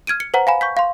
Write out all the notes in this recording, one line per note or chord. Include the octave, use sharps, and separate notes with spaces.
F6 G#6 D7 D#7
C#7
B4 C5 F#5 A#5
F5 G#5 B5
C#6 G6 B6
F5 C6